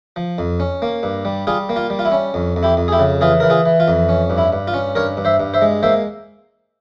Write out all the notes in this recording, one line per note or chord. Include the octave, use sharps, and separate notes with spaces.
F3
F2
C#4
A#3
G2
G3
G3 F4 G#4
A#3
F4
G3
F4
E4
C#4
F2
F2
E4 G4
F2
G#4
E4 G4
C#3
E3 F4 G#4
E3 A#4
F4 G#4
E3
F4
F2
C#4
G2
E4
G2
F4
C#4
G2 A#4 C#5
G2
C5 E5
G2
C5 E5
G#3
A#3 C5 E5